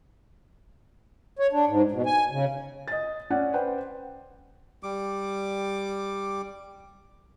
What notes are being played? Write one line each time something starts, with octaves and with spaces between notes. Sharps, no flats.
C#5
D4
G#2
B2
G#5
C#3
D#5 A6
C#4 D5 F#5
B4 C5 F#5 G5
G3 D6